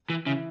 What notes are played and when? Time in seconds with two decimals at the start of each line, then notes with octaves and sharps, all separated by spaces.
0.10 E3
0.26 C#3 E3